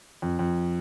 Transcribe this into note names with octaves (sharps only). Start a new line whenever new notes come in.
F2
F2